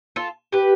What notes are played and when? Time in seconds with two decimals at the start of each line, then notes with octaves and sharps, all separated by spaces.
0.16 F4 A4
0.52 G4 B4